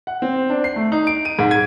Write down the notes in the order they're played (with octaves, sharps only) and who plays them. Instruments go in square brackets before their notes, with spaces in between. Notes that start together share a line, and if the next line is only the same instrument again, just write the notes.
[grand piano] F#5
C4
D4
C7
A3
D#4
D7
D#7
G#2
G#6